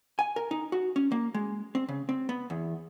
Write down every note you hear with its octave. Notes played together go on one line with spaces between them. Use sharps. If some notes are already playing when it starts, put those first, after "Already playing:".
G#5
A#4
D#4
F#4
C#4
A#3
G#3
C4
C#3
C4
B3
E2